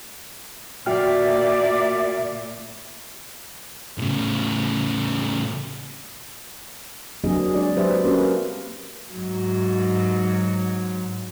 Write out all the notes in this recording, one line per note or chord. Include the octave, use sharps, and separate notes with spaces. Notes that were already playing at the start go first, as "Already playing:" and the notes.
A#2 F#4 D5 E5 G5 F6
A2 C#3
F#3 A#3 C4 D4 G#4 D#5
G#3 D4 G#4 C#5 D5
F#3 G4 B4 C5 D5 E5
A#3 C#4 F#4 A#4 B4
G#2 F#3